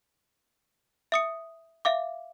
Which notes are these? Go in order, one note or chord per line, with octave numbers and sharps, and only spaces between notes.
E5 D#6 C#7
E5 F5 D6